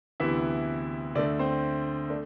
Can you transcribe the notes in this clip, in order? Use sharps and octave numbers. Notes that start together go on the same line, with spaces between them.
D2 C3 E3 B3 E4 E5
D2 D3 A3 D4 D5
C4 C5
A3 D4